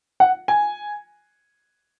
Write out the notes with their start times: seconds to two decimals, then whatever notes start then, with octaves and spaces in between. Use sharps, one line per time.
0.20 F#5
0.48 G#5